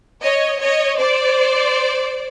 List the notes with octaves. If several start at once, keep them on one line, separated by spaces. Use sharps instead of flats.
C#5 D#5
C#5 D#5
C5 D5